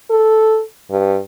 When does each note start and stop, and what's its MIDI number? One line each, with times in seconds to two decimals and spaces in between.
0.10 0.62 69
0.90 1.18 43